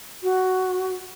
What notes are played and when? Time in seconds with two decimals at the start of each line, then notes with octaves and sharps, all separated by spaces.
0.23 F#4